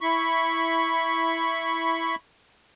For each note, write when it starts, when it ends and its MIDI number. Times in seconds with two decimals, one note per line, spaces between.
0.01 2.15 64
0.01 2.15 83
0.01 2.15 85